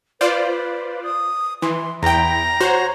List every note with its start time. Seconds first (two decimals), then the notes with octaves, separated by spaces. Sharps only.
0.21 F4 B4 C5 D5
1.03 D#6
1.62 E3 C6
2.03 E2 E4 G5 A#5
2.61 F#4 C5 C#5